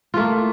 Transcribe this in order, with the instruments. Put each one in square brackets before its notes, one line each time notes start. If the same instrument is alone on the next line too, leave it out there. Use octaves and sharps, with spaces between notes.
[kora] F4
A3
A#3